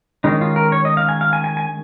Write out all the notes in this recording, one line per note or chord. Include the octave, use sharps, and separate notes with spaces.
D#3 G#3 C#4 D#4
F4
A#4
C#5
D#5
F5
G#5
F5
G#5
G#5
G#5